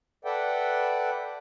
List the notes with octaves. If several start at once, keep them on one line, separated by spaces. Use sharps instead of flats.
A4 B4 D5 E5 F#5 G5